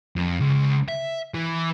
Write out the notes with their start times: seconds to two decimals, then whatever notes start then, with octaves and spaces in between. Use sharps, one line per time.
0.16 F2
0.41 C#2
0.89 E5
1.35 E3